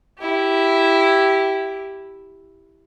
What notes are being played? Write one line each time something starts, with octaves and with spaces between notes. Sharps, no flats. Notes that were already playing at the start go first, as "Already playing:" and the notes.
E4 G4